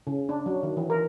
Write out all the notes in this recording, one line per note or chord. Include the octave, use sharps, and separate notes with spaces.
C#3
D4
F#3
D#3
E3
A#4